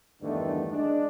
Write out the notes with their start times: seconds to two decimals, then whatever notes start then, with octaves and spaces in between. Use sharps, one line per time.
0.21 E2 G2 D3 D#3 A3
0.70 G#3 D4